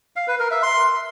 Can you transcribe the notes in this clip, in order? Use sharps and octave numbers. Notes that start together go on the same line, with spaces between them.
F5
B4
A#4
E5
C6